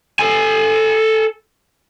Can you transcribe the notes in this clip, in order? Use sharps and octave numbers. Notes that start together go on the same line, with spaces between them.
A4 G#5